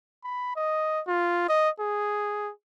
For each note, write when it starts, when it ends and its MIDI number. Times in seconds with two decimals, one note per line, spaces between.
0.24 0.55 83
0.56 1.00 75
1.07 1.47 65
1.49 1.69 75
1.80 2.51 68